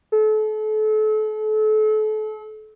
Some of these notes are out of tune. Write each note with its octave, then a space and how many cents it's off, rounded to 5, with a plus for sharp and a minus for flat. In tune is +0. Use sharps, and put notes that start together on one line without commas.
A4 -35